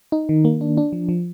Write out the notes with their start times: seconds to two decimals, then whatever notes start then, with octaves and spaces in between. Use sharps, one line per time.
0.12 D#4
0.29 D#3
0.45 A#3
0.61 D4
0.77 D4
0.93 F3
1.09 F3